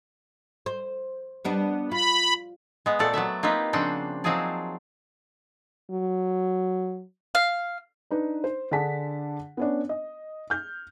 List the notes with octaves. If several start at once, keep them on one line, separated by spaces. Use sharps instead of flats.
C5
G3 B3 D4
F4 B5
G#3 B3
A#2 A3 C4 A4 D5 F#5
F#3 B3 D5 E5
A#3 C4 D#4 F4 G4 B4
C#3 F3 C4 D4 F#5 G5
F3 F#3 C4 D#4 G#4 D5
F#3
F5
D4 D#4 B4
C5
D3 D4 G#4 A5 B6
B3 C#4 D4
D#5
F6 G6